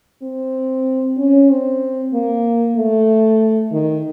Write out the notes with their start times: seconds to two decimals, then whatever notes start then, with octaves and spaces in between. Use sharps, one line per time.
0.22 C4
1.18 C#4
1.50 C4
2.13 A#3
2.76 A3
3.72 D#3